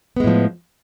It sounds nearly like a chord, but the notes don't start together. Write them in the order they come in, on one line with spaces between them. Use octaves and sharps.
B3 G#3 A2 F3